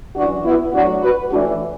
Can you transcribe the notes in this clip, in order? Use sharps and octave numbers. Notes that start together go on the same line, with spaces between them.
F#2 E3 D4 F#4
B3 E4
A2 F#3 D4 F#4
F#4 B4
A2 E3 D4 F#4